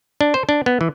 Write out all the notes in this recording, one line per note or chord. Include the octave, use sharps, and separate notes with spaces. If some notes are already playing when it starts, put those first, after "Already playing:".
D4
C5
D4
B3
E3